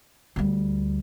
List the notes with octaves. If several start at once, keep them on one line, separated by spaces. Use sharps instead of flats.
D2 G3